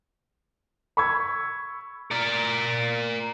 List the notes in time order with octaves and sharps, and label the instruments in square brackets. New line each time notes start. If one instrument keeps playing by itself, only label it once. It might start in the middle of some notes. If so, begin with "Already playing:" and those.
[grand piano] B5 C#6 E6 G#6
[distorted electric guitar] A#4 D5